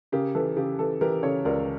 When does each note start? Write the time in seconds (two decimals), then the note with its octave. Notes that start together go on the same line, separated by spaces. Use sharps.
0.12 C#3 G4 A#4
0.35 E3 A4
0.57 C#3 G4
0.79 E3 A4
1.01 E3 G4 A#4
1.23 C#3 A4 C#5
1.45 C#2 A#4 D5